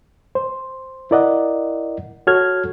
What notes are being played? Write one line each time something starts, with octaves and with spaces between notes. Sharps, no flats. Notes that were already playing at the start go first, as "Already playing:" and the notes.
C5
E4 A#4 D5 D#5 F#5
F#4 A4 C#5 F6 G#6